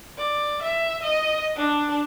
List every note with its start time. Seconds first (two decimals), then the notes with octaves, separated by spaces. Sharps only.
0.18 D5
0.63 E5
1.03 D#5
1.56 D4